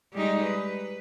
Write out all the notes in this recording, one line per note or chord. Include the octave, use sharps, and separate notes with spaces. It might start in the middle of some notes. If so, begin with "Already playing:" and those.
G3 G#3 D#4
B4